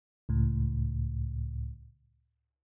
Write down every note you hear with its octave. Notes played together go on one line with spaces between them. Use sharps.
C#2 A2